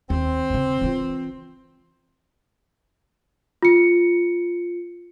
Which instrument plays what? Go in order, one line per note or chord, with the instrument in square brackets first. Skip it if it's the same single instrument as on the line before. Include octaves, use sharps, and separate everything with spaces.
[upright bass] D#2 [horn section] C4
[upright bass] D#2 C#3
E3 F4
[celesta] F4 C#7